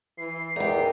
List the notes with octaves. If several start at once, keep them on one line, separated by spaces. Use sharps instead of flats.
E3 C7
E2 D#4 G4 A#4